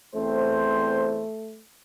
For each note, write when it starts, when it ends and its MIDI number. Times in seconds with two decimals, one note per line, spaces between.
0.15 1.24 40
0.15 1.61 57
0.15 1.24 60
0.15 1.24 72